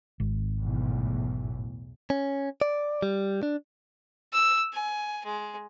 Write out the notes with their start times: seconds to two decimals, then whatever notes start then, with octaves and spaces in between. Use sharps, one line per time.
0.20 G#1
0.60 B1 E2 A2
2.10 C#4
2.61 D5
3.02 G3
3.43 D4
4.33 E6
4.73 G#5
5.26 G#3